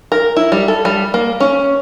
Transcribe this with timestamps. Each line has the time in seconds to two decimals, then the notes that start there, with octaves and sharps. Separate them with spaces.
0.12 A#4
0.36 E4
0.52 G3
0.68 A4
0.85 G3
1.14 A#3
1.40 C#4